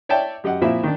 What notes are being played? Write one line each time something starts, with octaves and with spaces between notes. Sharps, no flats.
C#5 D5 E5 G5 A5
F#2 G4 D#5 F#5
A#2 F3 C4 E4 E5 B5
D#3 D4